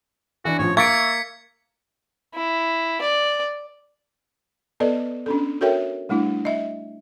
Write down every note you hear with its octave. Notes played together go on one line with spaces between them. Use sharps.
E3 D4 F#4
A1 F3 C#5
A#3 E5 C#6 G#6 A6 B6 C#7 D7
E4
D5
B3 A4 B4 D5 D#5
C#4 D4 A4
F#4 A4 A#4 C#5 E5 G5
G3 A3 D4 E4
D#5 E5